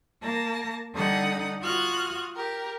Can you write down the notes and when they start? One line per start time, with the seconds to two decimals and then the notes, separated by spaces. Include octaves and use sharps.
0.21 A#3 A5 A#6
0.94 D3 G3 D#4 F#5 D#6
1.62 F4 F#4 D#6 F6 F#6 G#6
2.35 G4 A#4